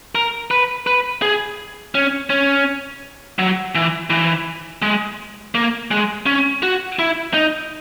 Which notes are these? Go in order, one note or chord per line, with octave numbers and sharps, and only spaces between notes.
A#4
B4
B4
G#4
C#4
C#4
F#3
E3
E3
G#3
A#3
G#3
C#4
F#4
E4
D#4